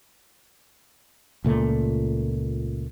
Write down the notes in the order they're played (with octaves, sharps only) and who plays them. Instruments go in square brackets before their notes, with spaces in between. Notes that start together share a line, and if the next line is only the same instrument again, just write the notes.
[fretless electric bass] C#2 A#2 A3